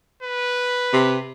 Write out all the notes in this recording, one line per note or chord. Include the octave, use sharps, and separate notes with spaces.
B4
C3